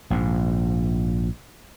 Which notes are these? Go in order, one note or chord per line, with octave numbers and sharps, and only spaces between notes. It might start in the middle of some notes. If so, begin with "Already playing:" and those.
A#1 G#2